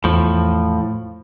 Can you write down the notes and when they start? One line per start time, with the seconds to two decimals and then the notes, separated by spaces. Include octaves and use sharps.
0.04 E2 A2 F3